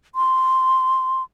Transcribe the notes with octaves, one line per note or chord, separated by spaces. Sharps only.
C6